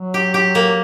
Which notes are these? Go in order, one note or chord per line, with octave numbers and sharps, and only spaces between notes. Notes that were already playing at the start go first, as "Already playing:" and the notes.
Already playing: F#3
G4
G4
A#3